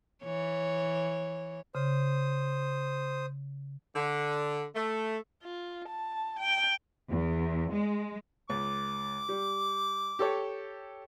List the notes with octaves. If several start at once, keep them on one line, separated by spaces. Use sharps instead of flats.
E3 C#5
C#3 C5 D#6
D3
A3
F4
A5
G5
E2
G#3
C#2 D6
G3
G4 A4 C#5